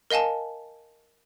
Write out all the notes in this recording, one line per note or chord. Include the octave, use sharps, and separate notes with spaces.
A#4 D#5 F5 G#5 A5